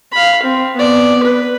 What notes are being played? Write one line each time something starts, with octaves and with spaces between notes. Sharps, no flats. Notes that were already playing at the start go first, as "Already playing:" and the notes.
F5 B5
C4
B3 D5
B4